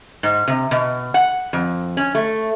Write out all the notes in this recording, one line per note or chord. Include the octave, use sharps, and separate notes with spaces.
G#2
C3
B2
F#5
F2
C#4
A3